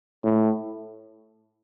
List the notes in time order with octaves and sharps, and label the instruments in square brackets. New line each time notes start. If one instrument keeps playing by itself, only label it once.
[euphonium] A2